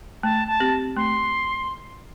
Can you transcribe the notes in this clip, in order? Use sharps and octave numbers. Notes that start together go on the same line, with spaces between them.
A3 A5
A5
C4 G4
A3 C6